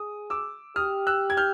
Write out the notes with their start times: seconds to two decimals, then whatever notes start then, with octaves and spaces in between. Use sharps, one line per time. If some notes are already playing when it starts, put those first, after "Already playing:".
Already playing: G#4 D#6
0.30 D6 E6
0.76 G4 D#6 F6
1.07 E6 F#6
1.30 G#6
1.37 F6 G6